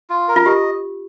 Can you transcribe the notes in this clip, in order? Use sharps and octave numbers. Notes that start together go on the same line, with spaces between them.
F4
A#4
F4
G4 D#5